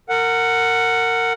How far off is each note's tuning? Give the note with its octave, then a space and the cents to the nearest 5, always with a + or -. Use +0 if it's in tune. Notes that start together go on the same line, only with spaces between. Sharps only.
A#4 -25 F#5 +0